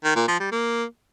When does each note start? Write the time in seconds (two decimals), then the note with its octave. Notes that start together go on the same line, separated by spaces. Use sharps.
0.04 D#3
0.16 A#2
0.28 F3
0.40 G3
0.52 A#3